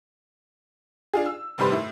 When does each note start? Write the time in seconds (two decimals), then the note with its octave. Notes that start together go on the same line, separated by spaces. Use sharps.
1.13 D4 F4 G#4
1.26 E6
1.58 F1 D#2 C3 G3 B4 C6
1.72 A2 E4